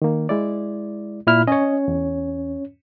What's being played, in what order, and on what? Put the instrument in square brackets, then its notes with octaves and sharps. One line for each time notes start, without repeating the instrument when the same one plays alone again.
[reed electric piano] D#3 A#3
G#3 E4 D5
[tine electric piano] A#2 E4 F6
[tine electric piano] C#4 C#5 [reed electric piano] D#5
[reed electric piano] E2